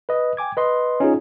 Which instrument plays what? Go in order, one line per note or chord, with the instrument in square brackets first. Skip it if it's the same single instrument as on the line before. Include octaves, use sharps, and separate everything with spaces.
[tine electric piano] B4 D#5
G5 G#5 D6 G#6
B4 D#5 C6
C#4 D#4 F4 G#4